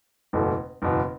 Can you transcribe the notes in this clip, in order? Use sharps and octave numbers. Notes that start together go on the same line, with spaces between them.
F#1 E2 B2 A3
F#1 E2 B2